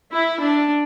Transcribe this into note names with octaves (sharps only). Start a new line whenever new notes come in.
E4
D4